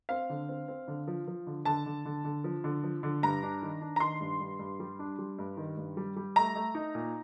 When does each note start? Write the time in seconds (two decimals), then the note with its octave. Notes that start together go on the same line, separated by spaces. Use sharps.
0.09 C4 F5
0.30 D3
0.49 C4
0.68 C4
0.88 D3
1.08 F3
1.27 F3
1.47 D3
1.65 D3 A5
1.86 D3
2.05 D3
2.24 D3
2.44 F3
2.64 D3
2.83 F3
3.03 D3
3.23 G2 A#5
3.43 D4
3.62 D#3
3.81 D4
3.96 A#5
4.00 D#3 C6
4.21 G2
4.40 G2
4.59 G2
4.80 G3
4.99 D4
5.19 G3
5.39 G2
5.57 D#3
5.77 G2
5.97 G3
6.16 G3
6.36 A3 A#5
6.56 A3
6.75 D#4
6.95 A#2